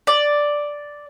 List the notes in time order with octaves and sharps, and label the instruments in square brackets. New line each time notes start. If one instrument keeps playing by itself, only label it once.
[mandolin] D5